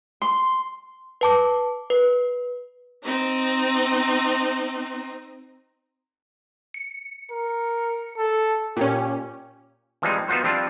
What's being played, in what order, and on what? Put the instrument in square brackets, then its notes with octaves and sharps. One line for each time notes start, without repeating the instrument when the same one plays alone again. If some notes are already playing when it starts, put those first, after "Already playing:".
[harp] C6
[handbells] B4 A5 D6
B4
[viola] C4 D#4
[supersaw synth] C#7
[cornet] A#4
A4
[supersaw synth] A#2 C#4 [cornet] G4
[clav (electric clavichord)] E3 F3 G3 G#3 C4 D#4
B3 D#4 F4 F#4 C5
F3 G3 C4 D4 F4